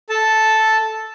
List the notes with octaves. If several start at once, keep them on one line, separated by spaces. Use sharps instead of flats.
A4 A5